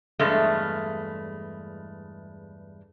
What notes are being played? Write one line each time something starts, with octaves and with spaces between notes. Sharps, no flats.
E2 G2 G#3 A3